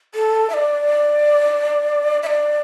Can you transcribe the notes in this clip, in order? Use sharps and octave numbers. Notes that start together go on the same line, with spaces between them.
A4
E5
D5
E5
D5